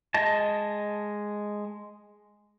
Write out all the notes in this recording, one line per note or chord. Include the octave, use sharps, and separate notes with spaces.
G#3 D#5 A5